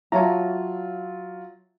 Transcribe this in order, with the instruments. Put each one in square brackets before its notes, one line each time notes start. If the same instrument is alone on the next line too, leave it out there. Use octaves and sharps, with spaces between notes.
[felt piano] F#3 F4 [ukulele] C#5 A#5 [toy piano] E5 A5